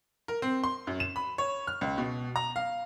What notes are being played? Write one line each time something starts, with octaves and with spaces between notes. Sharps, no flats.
A#4
C4
C6
F#2
E7
B5
C#5
F6
C#2
B2
A#5
F5